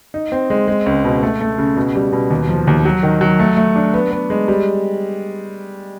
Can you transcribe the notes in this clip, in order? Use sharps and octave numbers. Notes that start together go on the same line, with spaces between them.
D#4
C4
G#3
G#3
C#2
B2
A3
A3
C#3
B2
G3
B2
D#2
F3
D#2
F#3
D#3
F#3
A3
A3
D4
B3
B3
G#3
G3